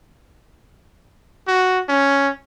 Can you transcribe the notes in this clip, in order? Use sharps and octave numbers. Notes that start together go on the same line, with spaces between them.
F#4
C#4